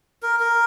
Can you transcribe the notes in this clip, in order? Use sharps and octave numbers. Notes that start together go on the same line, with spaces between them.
A#4
A#4